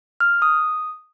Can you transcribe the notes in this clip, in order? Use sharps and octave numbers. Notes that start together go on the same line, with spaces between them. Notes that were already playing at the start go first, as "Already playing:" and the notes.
F6
D#6